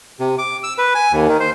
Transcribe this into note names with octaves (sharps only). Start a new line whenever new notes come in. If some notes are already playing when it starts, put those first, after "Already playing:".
C3
D6
E6
B4
G#5
D#2
D#3
C5